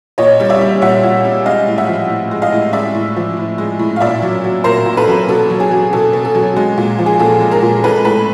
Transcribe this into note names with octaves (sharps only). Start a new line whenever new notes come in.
A#2 C#5 D#5
G3
D5 E5
G3
A#2 E5 F#5
A#2
G3
G#3 D#5 F5
A2
E5 F#5
F3
A2
G#3
D#5 F5
A2
G#3 D5 E5
A2
F3
A2
G#3
A2
F5
A#2 D5 E5
F#3
F#3
A#2 A#4 C5
A#2
A4 B4
F#3
B2 A4
F#3
G#4
F#3
B2 A4
B2
A4
F#3
G#3
A#2
F3
G#4
A#2 A4
G#3
G#4 A#4
A#2
G#3 A4 B4
A2 A4 B4